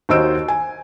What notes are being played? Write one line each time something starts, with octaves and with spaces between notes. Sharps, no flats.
D#2 F#4 C5 D#5 E6 D7
G#5